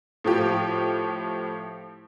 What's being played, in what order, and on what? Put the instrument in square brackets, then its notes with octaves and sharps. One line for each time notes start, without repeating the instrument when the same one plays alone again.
[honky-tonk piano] A2 F3 G4